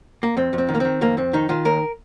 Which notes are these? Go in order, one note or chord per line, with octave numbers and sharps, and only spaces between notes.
A#3
F2 C4
F2
C4
D#3
A#3
D#3 C4
F2 A#3
F2 C4
D#3 D#4
D#3 F4
D#2 A#4